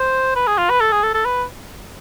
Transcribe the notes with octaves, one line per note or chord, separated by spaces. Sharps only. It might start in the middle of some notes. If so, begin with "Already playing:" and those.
Already playing: C5
B4
G#4
F4
B4
A4
G#4
A4
A4
B4